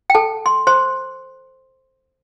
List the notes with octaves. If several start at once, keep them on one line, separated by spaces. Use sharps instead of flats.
G5
A4 A5
C6
C5 C6